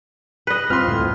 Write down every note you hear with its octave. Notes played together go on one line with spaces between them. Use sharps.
B4 D#5
G3 C4 F4 C5 C6 F6
D2 A2